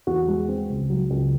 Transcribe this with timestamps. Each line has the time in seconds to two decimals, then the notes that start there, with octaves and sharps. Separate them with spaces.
0.07 E2 F#4
0.28 G#3
0.49 C4
0.69 C#2
0.90 F#3
1.10 C#2